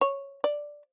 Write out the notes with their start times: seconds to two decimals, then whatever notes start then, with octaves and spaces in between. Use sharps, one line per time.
0.01 C#5
0.44 D5